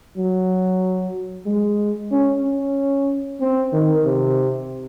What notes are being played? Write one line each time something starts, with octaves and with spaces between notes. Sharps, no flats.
F#3
G#3
C#4
C#4
C4
D#3
C3